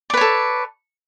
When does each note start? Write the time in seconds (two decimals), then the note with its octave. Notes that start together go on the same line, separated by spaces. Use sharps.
0.10 D5
0.14 B4
0.17 C#5
0.21 A4